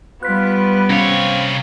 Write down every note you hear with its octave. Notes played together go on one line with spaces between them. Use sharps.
G3 B3 F4 B4 F#6 B6
C3 C4 C#4 C#5 F5 F7